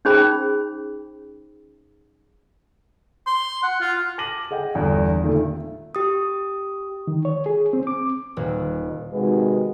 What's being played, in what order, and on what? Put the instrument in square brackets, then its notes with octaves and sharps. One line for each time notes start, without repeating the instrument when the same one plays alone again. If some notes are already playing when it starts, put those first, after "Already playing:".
[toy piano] C#4 D#4 G#4 C5 G5 B5
[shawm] C6
F#5
F4
[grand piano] A5 D6 A#6 D#7 F#7
G#4 D#5 F#5 G5
G1 E2 G2
A#2 D#3 A3
E5
[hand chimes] G4 D#6
[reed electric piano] D#3
C#5
G#4
C4
D6
[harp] D#1
[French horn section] C3 D#3 G#3 D#4 F#4 B4